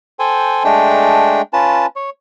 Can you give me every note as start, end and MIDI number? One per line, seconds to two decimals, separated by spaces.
0.19 0.63 69
0.19 0.63 72
0.19 0.63 79
0.19 0.63 80
0.64 1.42 56
0.64 1.42 57
0.64 1.42 62
0.64 1.42 79
1.53 1.86 61
1.53 1.86 65
1.53 1.86 71
1.53 1.86 81
1.96 2.10 73